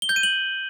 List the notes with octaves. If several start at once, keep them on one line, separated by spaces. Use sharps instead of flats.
G7
G6
D#7
F#7